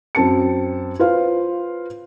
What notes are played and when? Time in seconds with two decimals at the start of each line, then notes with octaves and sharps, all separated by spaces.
0.15 F#2 C4 A5 C#7
0.99 F4 B4 C5 F5